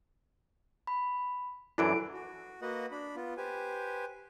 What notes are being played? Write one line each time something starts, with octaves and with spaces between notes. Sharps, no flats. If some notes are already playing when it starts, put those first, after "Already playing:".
B5
F#2 E3 D4 E4 A4 D7
F#4
A#3 F#4 B4 D#5 F#5
D4 B5
B3 F4
G4 B4 C5 G#5